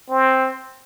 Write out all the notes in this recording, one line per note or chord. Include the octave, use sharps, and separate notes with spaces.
C4